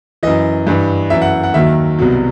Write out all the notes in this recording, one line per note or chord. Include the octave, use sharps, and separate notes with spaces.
F#2 E3 D#5
G2 E3
F#2 E3 E5
F#5
F#5
D#2 D#3 F#3 E5
C2 B2 F#3